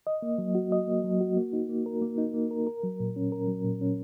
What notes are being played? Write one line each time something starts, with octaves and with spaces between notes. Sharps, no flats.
D#5
A#3
F#3
F#4
D#5
A#3
F#3
F#4
A#3
D#4
A#3
A#4
A#3
D#4
A#3
A#4
A#4
F#3
A#2
C#4
A#4
F#3
A#2
C#4